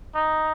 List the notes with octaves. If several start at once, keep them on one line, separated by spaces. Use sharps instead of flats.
D#4